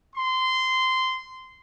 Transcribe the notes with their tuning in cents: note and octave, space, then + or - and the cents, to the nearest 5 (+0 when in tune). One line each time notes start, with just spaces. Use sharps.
C6 -15